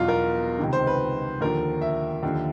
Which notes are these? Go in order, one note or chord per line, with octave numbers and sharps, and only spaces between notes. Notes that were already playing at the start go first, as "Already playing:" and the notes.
Already playing: E2 B2 F#3 F4
A#4
C#2 C3 D#3
C5
B4
D#2 D3 F3 A#4
E5
D#2 D3 F3